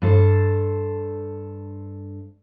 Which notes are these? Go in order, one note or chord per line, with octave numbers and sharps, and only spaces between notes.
G2 A4 C5